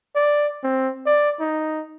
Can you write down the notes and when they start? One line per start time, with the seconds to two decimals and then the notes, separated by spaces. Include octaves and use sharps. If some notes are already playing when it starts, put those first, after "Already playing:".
0.15 D5
0.63 C4
1.06 D5
1.40 D#4